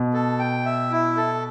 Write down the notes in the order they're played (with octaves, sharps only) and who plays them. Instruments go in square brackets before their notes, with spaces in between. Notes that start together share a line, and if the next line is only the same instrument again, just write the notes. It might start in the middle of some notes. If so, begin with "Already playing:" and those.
Already playing: [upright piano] B2
[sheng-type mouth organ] A4
G5
E5
E4
A4